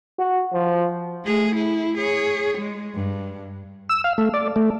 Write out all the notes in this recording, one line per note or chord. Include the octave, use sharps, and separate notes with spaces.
F#4
F3
A3 G#4
E4
G#4 C#5
G#3
G2
E6
F5
A3
D5
A3